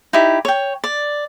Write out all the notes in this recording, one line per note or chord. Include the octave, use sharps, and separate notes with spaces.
D#4 E4 G4
C#5 G5
D5